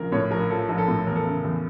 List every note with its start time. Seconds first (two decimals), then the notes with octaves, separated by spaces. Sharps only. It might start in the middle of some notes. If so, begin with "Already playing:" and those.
Already playing: A#1 C#3 A#4
0.12 A2 C#5
0.31 A#1 A#4
0.50 F3 A4
0.69 A#1 A#4
0.78 A4
0.88 A2
1.07 E2 A#4
1.16 A4
1.24 C#3 A#4
1.44 E2